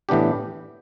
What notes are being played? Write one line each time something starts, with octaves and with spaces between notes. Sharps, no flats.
A2 E3 B3 D4 G4